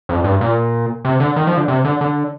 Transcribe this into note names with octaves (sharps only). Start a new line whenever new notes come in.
F2
G2
A#2
C3
D3
D#3
F3
D3
C3
D3
D3